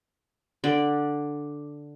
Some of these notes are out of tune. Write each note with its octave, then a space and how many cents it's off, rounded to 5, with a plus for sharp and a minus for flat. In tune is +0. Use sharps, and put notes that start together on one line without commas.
D3 +0 D5 +0